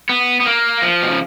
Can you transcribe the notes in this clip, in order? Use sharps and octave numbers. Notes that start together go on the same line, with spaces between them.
B3
B3
A#3
F3
B2
C#3